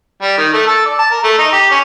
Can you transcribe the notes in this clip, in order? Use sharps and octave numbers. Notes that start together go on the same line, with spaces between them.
G3
D#3
A3
A4
D5
A5
A#4
A3
D#4
G4
C#4